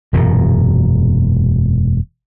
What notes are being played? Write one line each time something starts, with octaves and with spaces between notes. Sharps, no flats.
E1 F#2 A#2